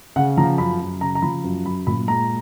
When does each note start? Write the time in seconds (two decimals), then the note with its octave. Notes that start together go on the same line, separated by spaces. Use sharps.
0.16 C#3 F#5
0.37 F3 A#5
0.58 F#2 B5
0.80 F#2
1.01 C#3 A#5
1.15 A#5
1.22 F3 B5
1.44 F#2
1.65 F#2 B5
1.87 A#2 B5
2.08 G#3 A#5